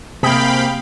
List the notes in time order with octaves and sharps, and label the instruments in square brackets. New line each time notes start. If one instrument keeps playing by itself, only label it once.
[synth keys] C3 [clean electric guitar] A#3 G#4 [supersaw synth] F5 G5 B5